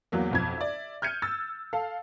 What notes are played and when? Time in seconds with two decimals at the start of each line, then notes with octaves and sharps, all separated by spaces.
0.12 E2 F#3 A#3
0.31 B1 F2 G#6
0.58 D5 E5
1.02 F6 G6 G#6 C#7 D#7
1.22 E6 A6
1.73 A4 F5